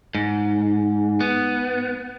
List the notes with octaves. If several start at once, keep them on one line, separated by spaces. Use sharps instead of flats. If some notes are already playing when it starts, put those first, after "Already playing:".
G#2
B3